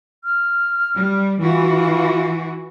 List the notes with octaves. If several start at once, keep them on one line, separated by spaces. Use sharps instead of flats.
F6
G3
E3 F4 F#4